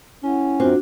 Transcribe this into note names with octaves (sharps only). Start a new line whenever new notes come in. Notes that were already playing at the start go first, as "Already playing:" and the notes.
C#4 E4 F#5
F#2 C4 D4 F4 F#4